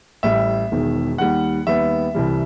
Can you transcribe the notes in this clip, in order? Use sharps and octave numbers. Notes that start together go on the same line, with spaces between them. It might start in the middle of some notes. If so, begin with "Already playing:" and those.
A1 A2 G3 E5
E1 E2 D#3
D#2 D#3 G3 F#5
D#2 D#3 G3 B3 E5
C2 C3 E3 G3